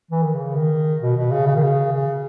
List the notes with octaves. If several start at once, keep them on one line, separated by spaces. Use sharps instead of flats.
E3
D#3
C#3
D#3
B2
B2
C#3
C#3
D#3
C#3
C#3